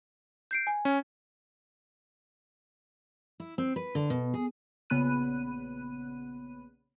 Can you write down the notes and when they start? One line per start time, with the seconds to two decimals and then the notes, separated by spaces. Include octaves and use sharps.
0.51 G6 C7 D7
0.67 G#5
0.85 C#4
3.40 E4
3.58 C4
3.76 B4
3.95 D3
4.10 B2
4.34 G#4
4.90 A#1 C#3 B3 B5 F#6 D#7